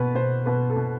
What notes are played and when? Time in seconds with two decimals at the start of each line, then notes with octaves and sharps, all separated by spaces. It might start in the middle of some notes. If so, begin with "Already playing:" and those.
Already playing: B2 B3 B4
0.15 B2 C5
0.46 B2 B4
0.70 A4
0.76 B2